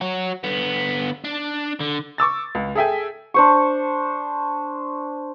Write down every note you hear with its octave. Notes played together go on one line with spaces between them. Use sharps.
F#4 C#5
D3 B3
D4
D3
C#6 D6 E6 A6
C#2
G#4 A4 E5 G5 G#5
D4 C5 C#6